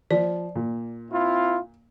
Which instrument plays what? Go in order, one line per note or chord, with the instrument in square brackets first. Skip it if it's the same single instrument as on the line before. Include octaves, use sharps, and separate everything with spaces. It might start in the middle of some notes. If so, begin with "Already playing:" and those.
[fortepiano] F3 [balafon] D5
[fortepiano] A#2
[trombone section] C4 E4 F4